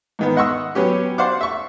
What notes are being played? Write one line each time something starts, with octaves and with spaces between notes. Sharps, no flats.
G#2 D#3 B3
D#5 F#5 C6 C#6 D#6 E6
F#3 B3 C#4 G4
C5 D5 F5 F#5 D6
E5 C#6